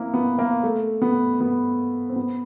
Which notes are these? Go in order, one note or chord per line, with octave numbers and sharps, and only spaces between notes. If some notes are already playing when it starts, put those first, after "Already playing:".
Already playing: A#3 C4 E4
B3
A#3
A3
B3
B3
C4
B3